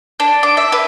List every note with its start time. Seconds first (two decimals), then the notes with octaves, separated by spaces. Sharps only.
0.20 D4
0.43 D6
0.57 E5
0.72 B4